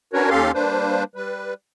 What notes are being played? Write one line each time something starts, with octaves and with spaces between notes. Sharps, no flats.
C#4 D4 F#4 A#4 B4 C#5
D#2 C#4 G4 A4 F5 C6
G3 A#3 D4 B4 C5
G3 B4